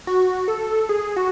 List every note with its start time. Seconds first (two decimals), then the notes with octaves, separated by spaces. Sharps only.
0.07 F#4
0.48 A4
0.89 G#4
1.16 F#4